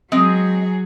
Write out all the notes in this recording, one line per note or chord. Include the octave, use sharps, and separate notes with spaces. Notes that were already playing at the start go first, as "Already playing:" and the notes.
F#3 G#3 C4 G#4 D#5